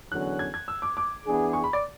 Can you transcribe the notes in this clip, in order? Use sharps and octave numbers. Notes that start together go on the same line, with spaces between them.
E2 D3 F#3 C#4 F#6
G#6
G#6
E6
D6
D6
E3 B3 D4 G#4
C#6
B5
D5